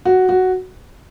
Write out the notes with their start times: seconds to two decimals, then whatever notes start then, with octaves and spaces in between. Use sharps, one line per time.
0.05 F#4
0.29 F#4